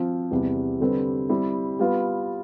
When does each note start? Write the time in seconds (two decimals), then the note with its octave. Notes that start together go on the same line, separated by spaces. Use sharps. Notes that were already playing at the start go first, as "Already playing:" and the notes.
Already playing: F3 C4 F4
0.31 E2 C3 G3
0.80 D3 G3 C4 G4 B4
1.29 G3 C4 E4 G4
1.79 G3 B3 F4 B4